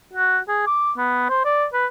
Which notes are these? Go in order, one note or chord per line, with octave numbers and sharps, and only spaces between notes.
F#4
G#4
D6
B3
C5
D5
B4